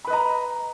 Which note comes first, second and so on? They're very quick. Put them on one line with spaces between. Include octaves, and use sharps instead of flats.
B5 B4 D#5 A#5